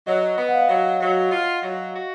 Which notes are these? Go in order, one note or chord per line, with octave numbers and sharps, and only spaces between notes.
F#3 D#5
B3
F#5
F5
F#3
F#3
F4
F#3
F#4